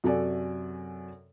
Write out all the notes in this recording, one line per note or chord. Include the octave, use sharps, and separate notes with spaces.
F#2 C3 F#4 A4 D5 G#5